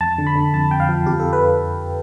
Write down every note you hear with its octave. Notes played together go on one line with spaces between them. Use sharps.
F2 A5
D3
B5
D3
F2 A5
F2 G5
F5
F3
F2 G4
A4
B4